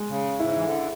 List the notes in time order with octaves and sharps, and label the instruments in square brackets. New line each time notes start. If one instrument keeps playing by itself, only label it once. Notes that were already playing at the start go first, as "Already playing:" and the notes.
Already playing: [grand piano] G#3
[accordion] C#3
[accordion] G#2 [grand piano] E4
[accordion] E3
D3